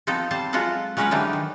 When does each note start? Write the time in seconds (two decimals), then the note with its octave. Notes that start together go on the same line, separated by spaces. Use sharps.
0.07 F3 B3 C4 D#4 A4
0.31 G3 C5 A5
0.53 F#3 G#3 F4 F#4 A4 F#5
0.97 F#3 G#3 C#4 A#4 B4 F#5
1.11 D3 E3 F#3 G3 D4 D#4
1.33 D#3